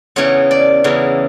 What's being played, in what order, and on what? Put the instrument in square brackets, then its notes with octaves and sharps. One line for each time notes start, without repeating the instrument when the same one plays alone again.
[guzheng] E2 C#3 E3 C#5
D5
E2 C#3 E3